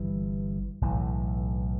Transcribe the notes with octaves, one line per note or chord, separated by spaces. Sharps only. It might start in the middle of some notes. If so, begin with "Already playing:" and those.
Already playing: G1 G2 E3
B1 A2 E3